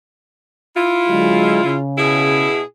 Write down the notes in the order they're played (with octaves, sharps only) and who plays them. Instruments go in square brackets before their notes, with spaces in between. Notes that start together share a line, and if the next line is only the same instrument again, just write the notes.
[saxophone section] E4 F4
[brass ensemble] D3 F#3 G#3
C#3
[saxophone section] B2 E4 G#4